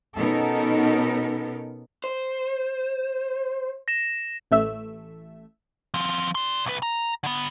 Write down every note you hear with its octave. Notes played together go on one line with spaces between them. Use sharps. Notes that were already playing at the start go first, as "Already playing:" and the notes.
B2 B3 C#4 D#4 A4 A#4
C5
A#6 E7
A1 A3 E5 E6
F3 C4
D5 C6
C2 B4
A#5
D3 B3